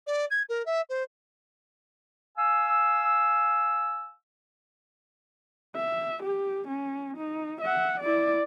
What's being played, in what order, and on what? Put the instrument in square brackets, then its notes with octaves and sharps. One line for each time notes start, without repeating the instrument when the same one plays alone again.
[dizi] D5
G#6
A#4
E5
C5
[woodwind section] F5 G#5 E6
[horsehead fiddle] E5
G4
C#4
D#4
E5 F#5
E4 D5